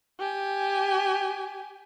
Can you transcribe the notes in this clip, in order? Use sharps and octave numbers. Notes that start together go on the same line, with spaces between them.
G4 G#5